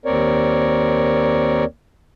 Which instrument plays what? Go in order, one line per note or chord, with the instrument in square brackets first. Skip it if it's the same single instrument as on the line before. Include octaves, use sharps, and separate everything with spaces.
[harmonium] D#2 C4 A#4 C#5 D5